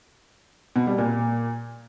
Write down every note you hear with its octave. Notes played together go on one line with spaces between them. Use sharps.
B2
G3
A#2